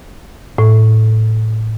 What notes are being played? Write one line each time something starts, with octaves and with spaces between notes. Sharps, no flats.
A2